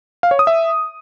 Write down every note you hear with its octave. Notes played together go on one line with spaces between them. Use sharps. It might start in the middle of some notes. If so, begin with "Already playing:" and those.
F5
C#5
D#6
E5